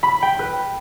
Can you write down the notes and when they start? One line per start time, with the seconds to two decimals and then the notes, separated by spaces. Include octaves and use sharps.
0.03 B5
0.22 G5
0.39 B4